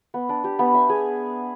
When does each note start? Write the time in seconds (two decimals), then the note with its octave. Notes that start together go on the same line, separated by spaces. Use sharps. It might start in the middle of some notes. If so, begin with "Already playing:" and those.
0.14 B3
0.29 D4
0.44 G4
0.59 B3
0.74 E5
0.89 G#4